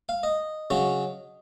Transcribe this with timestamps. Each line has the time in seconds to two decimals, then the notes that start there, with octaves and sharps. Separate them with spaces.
0.09 F5
0.23 D#5
0.70 C#3 F#3 C#4